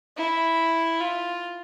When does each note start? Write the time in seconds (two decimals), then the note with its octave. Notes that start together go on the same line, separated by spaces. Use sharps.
0.17 E4
1.01 F4